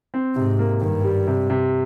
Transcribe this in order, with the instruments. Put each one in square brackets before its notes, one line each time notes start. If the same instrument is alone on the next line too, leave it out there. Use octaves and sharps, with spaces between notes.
[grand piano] C4
[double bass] G#2 [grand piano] C3
[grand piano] A#3
[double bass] G2 [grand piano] D#3
[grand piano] G3
C3
C3